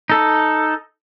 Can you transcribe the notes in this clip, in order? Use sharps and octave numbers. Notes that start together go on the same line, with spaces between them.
D#4 A4